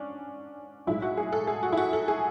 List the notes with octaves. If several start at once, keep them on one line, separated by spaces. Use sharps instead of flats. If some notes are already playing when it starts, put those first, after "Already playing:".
Already playing: G#2 C#4 D4
B1 A2 G#3 E4
F#4
G#4
A4
G#4
F#4
E4
F#4
A4
G#4